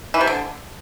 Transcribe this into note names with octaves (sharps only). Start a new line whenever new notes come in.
E3
C3
D3